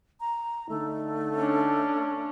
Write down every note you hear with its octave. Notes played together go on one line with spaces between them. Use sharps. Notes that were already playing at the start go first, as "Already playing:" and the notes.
A#5
D3 A3 D#4
C#4 D4